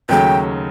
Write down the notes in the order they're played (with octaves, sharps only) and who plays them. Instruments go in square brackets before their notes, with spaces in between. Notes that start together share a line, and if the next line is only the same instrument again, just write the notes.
[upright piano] D#2 C#3 F#3 A3 [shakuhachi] G5